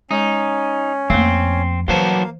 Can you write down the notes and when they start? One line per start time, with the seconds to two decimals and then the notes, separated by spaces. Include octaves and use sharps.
0.11 G#3 C#4 D#4
1.10 F2 A3 A#3 C4
1.88 E3 F#3 A#3 D#4 B4 C5 F5 A5